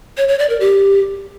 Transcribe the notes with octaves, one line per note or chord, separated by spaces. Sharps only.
C#5
C#5
D5
A#4
G4